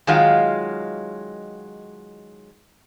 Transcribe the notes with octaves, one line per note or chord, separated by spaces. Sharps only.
D#3 F#3 G#3 F4 F5